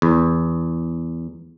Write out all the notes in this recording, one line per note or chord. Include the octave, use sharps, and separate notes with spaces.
E2